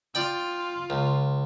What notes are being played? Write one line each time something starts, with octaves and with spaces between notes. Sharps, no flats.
F4 D5 G5
C#2